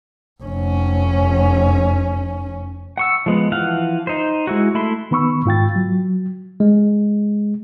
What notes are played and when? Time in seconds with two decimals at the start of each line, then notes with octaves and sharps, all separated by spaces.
0.43 F1 C#4
2.98 F#5 C#6 E6
3.26 F3 G#3 B3
3.52 E3 F3 F5 F#5
4.07 D#4 C5
4.47 G#3 E4 F#4
4.75 A3 E4 B5 C6
5.11 D#3 B3 B5 C#6 E6
5.45 G#2 F4 G5 A6
5.76 F#3
6.60 G#3